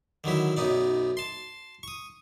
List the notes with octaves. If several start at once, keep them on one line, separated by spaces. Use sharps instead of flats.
D3 D#3 F#3 E4
B1 F#2 B3 D#4 D5
A5 C6
C#6 D#6